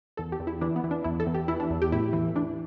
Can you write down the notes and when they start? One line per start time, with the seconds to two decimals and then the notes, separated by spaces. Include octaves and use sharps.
0.17 E2 A4
0.32 G4
0.40 E2
0.47 E4
0.61 E3 D4
0.76 B3
0.84 E3
0.91 D4
1.04 E2 E4
1.20 A4
1.27 E2
1.34 G4
1.48 E3 E4
1.60 D4
1.70 E2
1.82 G4
1.92 A2 E4
2.13 E3
2.35 E3 D4